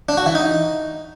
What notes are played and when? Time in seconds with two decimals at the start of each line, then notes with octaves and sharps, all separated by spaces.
0.09 D4
0.17 F#4
0.26 E3
0.35 D#4